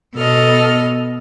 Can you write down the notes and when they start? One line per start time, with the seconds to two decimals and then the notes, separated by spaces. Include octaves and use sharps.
0.18 B2 B3 A4 D#5 F6